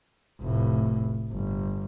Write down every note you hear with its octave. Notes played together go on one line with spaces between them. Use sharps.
F1 A2
G1